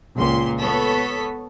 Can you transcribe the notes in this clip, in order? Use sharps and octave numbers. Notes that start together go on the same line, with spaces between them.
C#2 A#2 C6
B3 A4 C#5 B6